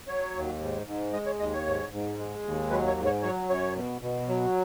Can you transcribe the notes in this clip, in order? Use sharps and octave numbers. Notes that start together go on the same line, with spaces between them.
F#3 C#5
D#2
G#2
G#2
G#3 D#5
C#5
D#2 D#5
C#5
G#2
G#2
G#3
D#2
F#3 B4
C#5
G#2
C#5
F#3 C#5
F#2 C#5
B2
B2
F#3